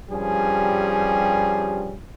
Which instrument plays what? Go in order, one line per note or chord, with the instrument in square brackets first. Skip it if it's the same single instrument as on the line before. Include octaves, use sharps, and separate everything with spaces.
[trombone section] G2 F3 G3 C#4 G4 G#4